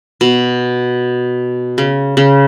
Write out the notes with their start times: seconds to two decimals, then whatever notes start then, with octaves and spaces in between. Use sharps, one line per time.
0.21 B2
1.78 C#3
2.17 C#3